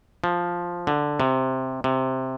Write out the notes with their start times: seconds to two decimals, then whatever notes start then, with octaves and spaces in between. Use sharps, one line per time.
0.24 F3
0.87 D3
1.20 C3
1.84 C3